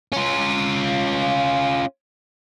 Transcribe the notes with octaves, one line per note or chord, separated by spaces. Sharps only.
C#4 F4